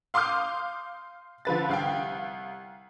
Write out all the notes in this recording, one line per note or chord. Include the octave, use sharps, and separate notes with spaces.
F5 C6 D6 D#6 F6 G6
D3 F3 B4 A6
C2 F5 G5